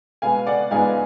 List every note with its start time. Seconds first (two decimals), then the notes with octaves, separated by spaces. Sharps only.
0.22 B2 G#3 B3 F5 G#5
0.47 D5 F#5
0.71 G#2 G#3 B3 F4 B4 F5 G#5